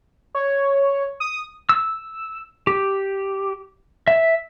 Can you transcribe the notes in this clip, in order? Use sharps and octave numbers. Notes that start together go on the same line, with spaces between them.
C#5
D#6
E6
G4
E5